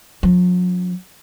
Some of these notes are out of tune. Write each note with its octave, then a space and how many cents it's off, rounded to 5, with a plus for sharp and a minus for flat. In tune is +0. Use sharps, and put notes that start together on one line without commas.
F#3 -45 C#4 +20